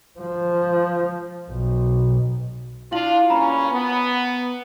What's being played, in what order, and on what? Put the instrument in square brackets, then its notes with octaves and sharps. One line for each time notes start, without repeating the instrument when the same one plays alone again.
[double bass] F3
B1
[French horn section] D4 F4 [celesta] E4 F5 F#7
[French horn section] G2 A#3 C#4 [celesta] A#5 B5
[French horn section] B3